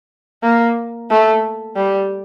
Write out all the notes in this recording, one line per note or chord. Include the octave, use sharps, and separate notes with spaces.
A#3
A3
G3